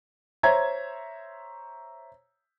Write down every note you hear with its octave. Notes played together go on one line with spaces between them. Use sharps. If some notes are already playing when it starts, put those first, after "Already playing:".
C5 C#5 E5 A#5 G#6